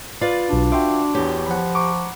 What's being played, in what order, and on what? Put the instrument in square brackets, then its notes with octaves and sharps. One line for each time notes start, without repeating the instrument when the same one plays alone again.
[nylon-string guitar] F4 B4 D5
[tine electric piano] B1 F#4 [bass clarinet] D4
[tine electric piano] F#4 C6 D6 [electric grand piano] E5 G5
[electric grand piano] E2 C#5 [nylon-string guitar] G4
[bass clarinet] F3 [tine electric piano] F#5 B5
[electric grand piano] A#5 C#6 D6